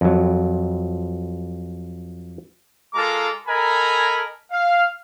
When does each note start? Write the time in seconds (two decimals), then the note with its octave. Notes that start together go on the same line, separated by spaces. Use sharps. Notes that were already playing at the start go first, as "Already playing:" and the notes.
0.01 F2 F#3
2.94 G#3 F4 A4 A#4 A#5 D6
3.47 A4 A#4 D#5 G#5 A#5 B5
4.52 F5